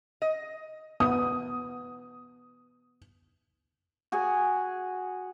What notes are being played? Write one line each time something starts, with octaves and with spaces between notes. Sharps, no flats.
D#5
B3 D#6
F#4 G#4 G#5